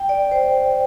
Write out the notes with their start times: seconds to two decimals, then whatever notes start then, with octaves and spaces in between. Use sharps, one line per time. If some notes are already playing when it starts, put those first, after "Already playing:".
Already playing: G5
0.09 D5
0.31 C5